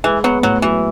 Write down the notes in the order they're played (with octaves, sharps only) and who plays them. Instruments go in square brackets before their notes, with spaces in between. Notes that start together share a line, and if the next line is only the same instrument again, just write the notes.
[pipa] E3 [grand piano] G#3
[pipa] F#3 [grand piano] B3
[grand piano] A2 [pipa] F#3
[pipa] E3 [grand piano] F#3